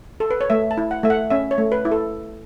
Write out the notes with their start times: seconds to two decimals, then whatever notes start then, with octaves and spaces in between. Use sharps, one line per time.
0.20 A4
0.31 B4
0.41 C#5
0.50 A3 E5
0.71 A5
0.78 E4
0.91 F#5
1.03 A3 E5
1.10 F#5
1.30 C#4 E5
1.51 C#5
1.58 A3
1.72 B4
1.85 E4
1.92 A4